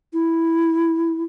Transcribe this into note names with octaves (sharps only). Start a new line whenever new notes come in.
E4